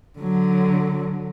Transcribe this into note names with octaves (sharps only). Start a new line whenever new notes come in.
D3 F#3